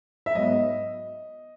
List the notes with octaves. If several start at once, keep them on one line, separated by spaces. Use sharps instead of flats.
E5
G#2 F#3 B3 D#5